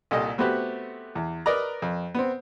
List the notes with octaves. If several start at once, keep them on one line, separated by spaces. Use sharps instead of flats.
C2 A#2 A4 D#5
A3 B3 C4 F#4 G4 B4
E2
A#4 B4 D5 D#5 A#5
F2
B3 C4